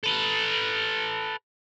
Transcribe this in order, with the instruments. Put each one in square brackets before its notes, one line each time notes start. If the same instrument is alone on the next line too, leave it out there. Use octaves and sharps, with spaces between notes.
[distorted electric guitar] A4 B4